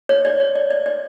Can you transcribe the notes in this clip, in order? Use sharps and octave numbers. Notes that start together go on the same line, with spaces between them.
C#5
D5
C#5
D5
D5
D5